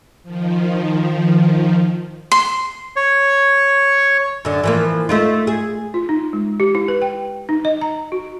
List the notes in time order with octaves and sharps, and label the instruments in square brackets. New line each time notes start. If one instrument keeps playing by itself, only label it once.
[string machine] D#3 F3
[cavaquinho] C6
[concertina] C#5
[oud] F#2 D3
E3 F3 A#3
A3 D#4 F4
G#4
[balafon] F4
D#4
G#3
G4
E4
B4
G5
D#4
D#5
A#5
F#4